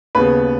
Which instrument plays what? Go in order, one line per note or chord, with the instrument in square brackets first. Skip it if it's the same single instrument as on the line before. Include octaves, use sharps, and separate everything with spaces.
[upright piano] D#2 C#3 B3 B4